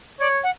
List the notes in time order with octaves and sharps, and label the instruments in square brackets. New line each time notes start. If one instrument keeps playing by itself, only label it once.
[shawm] C#5 [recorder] D5
[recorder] F#5